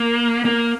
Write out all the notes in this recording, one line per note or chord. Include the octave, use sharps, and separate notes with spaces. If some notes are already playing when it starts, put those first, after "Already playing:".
Already playing: A#3
A#3